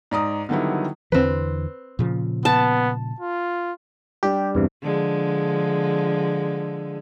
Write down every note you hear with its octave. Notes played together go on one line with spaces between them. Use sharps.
G#2 D5 A#5 D#6
D3 D#3 F#3 G3 B3 E4
E2 D3 E3 C4 B4
A#2 C#3 F3
B3 A5
F4
G3 D4 G4
E2 G2 C3
D3 F3 G#3